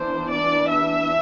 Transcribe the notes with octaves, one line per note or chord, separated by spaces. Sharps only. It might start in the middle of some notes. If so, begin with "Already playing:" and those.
Already playing: E3 B3 D4 C5
D5
E5